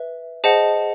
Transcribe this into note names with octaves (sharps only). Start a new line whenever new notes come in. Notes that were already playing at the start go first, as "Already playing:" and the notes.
Already playing: B4 E5
G#4 C5 D#5 F#5 A5